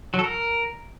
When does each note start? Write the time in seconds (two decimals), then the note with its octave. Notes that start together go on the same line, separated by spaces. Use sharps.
0.14 F#3
0.19 A4
0.24 A#4